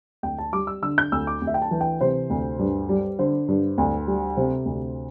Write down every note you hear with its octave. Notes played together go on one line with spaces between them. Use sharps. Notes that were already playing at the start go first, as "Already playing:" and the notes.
D2 G5
A5
G3 D6
E6
D3 E6
G6
D2 E6
D6
D2
E5
G5
A5
E3
G5
C3 C5
D2
G2
G3
D3 C5
G2
D2
G3
C3 C5
D2